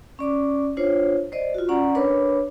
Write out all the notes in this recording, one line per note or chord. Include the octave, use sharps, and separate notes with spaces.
C#4 D5 D6
D4 F4 C5 C#5
C5 D5 D#5
F4 F#4
C#4 D5 F#5 A#5
D4 A#4 B4 C#5 B5 D6